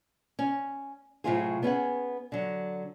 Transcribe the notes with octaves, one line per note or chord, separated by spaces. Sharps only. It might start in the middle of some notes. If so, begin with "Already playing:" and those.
C#4
A2 C3 F#3 F4 F#4 G#4
B3 C#4 G#4 F#5
D3 F#3